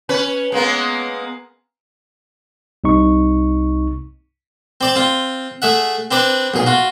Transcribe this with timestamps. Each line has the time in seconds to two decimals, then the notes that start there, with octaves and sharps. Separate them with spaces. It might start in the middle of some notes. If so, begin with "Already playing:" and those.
0.09 C#4 B4
0.52 G#3 A#3 B3
2.84 C2 C3 D#4 C#6
4.81 C4 D5 A5
4.96 C4 F4
5.62 A3 G#4 E5 F#5
6.11 C4 D4 B4 D5
6.54 B1 A#2 G#4
6.66 F4 F#4